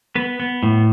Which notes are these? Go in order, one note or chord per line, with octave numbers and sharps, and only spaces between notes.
B3 B4
B3
A2